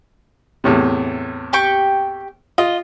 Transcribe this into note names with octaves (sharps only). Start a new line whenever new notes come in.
E2 A2 C3
G4 G5 C#6
F4 D#5